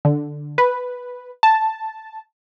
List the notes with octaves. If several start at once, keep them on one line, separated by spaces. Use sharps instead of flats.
D3
B4
A5